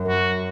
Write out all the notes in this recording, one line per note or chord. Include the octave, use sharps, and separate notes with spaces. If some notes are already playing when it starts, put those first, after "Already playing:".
Already playing: F#2
F#4